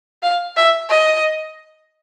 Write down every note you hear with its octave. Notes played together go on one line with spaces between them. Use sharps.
F5
E5
D#5